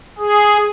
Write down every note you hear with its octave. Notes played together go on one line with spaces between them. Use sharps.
G#4